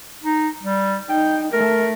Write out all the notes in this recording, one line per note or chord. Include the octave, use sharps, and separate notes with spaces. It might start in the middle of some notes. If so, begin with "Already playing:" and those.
D#4
G3
D#4 G5
A3 A#4